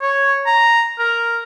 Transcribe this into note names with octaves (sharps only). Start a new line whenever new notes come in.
C#5
A#5
A#4